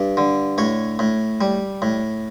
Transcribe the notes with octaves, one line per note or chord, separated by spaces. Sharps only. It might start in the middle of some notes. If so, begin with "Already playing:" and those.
Already playing: G2 D5
D3
A2 C#5
A2
G3
A2